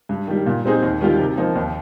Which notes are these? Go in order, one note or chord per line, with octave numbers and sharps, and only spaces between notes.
G2
D#3 G3
A#2
G3 C4 D#4 G#4
D#2
D#3 G3 A#3 F4
C3
F3 A#3 D#4
D#2